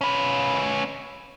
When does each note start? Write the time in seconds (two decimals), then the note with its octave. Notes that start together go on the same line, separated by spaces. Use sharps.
0.01 C#4 B4